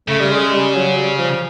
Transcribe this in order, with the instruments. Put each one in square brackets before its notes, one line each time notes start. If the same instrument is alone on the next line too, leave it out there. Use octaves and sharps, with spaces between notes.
[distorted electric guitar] C#3 [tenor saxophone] A3
[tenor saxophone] G3
G#3
G3
F#3
G3
F3